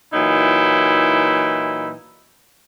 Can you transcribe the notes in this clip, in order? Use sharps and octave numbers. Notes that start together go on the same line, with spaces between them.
A#2 E3 F#3 D#4 E4